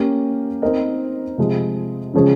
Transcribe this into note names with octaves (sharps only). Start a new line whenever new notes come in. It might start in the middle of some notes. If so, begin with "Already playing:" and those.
Already playing: A#3 C#4 G4 A#4
C4 D#4 A#4 D#5
C3 F3 G#3
C#3 F3 G#3 C#4 G#4